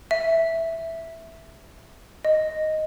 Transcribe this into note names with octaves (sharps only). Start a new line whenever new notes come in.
E5
D#5